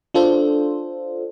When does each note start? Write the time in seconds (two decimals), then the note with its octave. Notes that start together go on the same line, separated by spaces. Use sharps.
0.14 D4 F4 A4 C5